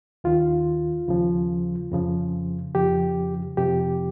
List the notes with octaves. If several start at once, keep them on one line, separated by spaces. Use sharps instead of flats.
D#2 D#3 F4
D#2 C#3 F3
F2 C#3 F3
F2 C#3 F3 G4
F2 C3 F3 G4